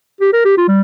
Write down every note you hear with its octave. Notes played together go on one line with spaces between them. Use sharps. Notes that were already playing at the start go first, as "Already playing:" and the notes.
G4
A#4
G4
F4
G3